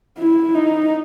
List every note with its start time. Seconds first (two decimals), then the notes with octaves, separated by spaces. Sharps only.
0.18 E4
0.55 D#4